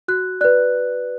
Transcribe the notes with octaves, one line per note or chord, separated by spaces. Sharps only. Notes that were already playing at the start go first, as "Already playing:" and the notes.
F#4 F#6
B4 D5 F#6